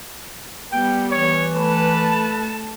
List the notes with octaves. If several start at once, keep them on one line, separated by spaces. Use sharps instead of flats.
G3 B3 G5
E3 C#5
A3 B4 A5